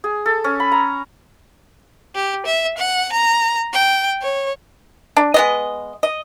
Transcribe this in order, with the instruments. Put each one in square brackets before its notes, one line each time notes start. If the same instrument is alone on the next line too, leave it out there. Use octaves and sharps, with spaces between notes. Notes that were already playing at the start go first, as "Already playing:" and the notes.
[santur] G#4
A4
C#4
B5
A#5
[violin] G4
E5
F#5
A#5
G5
C#5
[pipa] D4
G#3 B3 D#5
D#5